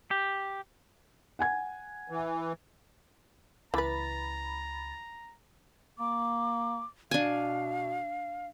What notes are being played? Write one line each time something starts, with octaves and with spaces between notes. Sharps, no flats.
G4
F#5 G#5 G#6
E3
C#2 E3 B4 A#5 B5 A6
A#3 D6
B2 D4 F5 G#5